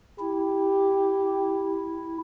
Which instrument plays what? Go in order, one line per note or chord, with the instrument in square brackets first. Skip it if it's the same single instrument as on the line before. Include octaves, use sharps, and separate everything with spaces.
[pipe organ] E4 [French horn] G4